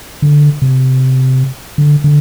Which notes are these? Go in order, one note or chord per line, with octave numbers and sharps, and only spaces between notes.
D3
C3
D3
D3